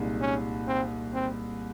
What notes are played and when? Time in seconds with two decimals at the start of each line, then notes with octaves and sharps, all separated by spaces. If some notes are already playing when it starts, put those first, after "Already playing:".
Already playing: C2 A#2 G#3 D#4
0.21 C#4
0.67 C4
1.14 C4